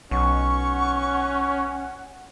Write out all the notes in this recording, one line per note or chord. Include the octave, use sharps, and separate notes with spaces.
B1 C#4 F#5 C#6